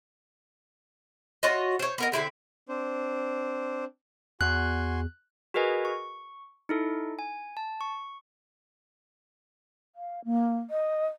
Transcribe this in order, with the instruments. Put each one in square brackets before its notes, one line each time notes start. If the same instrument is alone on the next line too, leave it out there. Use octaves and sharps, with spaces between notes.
[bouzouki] F4 F#4 C#5 D#5
C5 C#5
B3 A#4 D#5
D3 C4 E4 G4
[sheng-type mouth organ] C4 D4 C5
[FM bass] E2 [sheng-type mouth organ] F#4 G#5 C6 [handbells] F#6
[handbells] F#4 G#4 A#4 B4 D#5 G#5
C#6
D#4 E4 A4
G#5
A5
C#6
[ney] F5
A#3
D#5